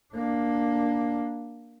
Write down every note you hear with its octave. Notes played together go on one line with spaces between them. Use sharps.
A#3 D4